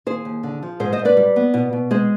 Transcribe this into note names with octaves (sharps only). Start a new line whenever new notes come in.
D#2 G#4 C5
D#2
D3
F3
G#2 G#4 C5
C5 D#5
G#2
B4 D5
G3
B3
B2
B2
G#3 G#4 C5